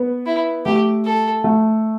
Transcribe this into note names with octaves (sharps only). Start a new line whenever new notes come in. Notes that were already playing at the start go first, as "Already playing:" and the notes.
Already playing: B3
E4
A3 G4
A4
A3